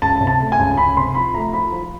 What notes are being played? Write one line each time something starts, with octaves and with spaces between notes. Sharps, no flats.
C#2 A5
C3
A5
A3
G#5
C#2
C#2 B5
C3 C6
F3 B5
A3 A#5
F3 B5
F3